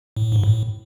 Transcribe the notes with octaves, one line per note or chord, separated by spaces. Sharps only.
A2
G#2
A2